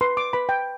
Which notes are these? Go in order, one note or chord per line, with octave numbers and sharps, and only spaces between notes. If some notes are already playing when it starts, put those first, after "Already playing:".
B4 C6
D6
B4 B5
G5